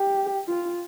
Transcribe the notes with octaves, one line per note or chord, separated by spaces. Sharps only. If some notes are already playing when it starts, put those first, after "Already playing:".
Already playing: G4
F4